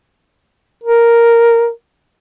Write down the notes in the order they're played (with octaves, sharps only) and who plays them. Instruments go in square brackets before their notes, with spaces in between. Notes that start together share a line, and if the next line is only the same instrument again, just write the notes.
[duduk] A#4